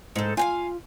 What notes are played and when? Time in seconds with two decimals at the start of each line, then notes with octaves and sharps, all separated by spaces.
0.16 G#2 D#4 A4
0.37 F4 F5 G5 G#5